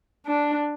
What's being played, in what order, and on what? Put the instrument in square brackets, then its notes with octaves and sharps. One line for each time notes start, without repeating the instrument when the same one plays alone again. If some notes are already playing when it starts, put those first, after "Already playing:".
[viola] D4